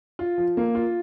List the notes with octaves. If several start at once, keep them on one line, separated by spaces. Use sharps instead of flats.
F4
F3
A#3
F4